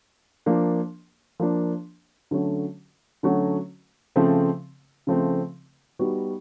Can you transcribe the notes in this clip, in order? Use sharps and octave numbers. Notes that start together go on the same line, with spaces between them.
F3 A#3 D4
F3 A#3 D4
D3 F#3 A3 C#4 F#4
D3 F#3 A3 C#4 F#4
C#3 F3 A3 C4
C#3 F3 A3 C4
G3 B3 D#4 F#4